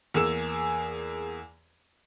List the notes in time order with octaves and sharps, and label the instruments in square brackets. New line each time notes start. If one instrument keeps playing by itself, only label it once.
[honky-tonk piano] E2 A#3 G#4 E6 E7